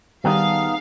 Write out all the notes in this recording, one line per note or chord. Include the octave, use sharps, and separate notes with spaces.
D#3 G3 B3 D#4 G#4 F5 A5